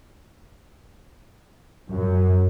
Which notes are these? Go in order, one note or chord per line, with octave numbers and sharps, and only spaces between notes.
F#2